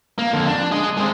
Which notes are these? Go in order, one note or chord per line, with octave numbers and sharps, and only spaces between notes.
A#3
F2 D3
D4
G#4 D#5
G#3 C4